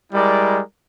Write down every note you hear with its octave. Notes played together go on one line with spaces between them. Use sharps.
G3 G#3 E4 A#4 D5